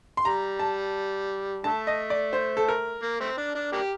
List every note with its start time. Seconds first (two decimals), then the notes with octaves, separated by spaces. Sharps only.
0.17 C6
0.25 G3 A#5
0.59 A5
1.64 D3 A3 A5
1.87 D#5
2.10 D5
2.33 C5
2.57 A4
2.68 A#4
3.03 A#3
3.20 A3 C4
3.37 D4
3.55 D4
3.72 A#3 D4 G4